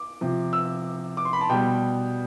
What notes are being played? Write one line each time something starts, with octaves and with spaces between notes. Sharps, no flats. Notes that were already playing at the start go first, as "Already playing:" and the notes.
Already playing: D6
C3 F3
E6
D6
C6
B5
A5
B2 G3 G5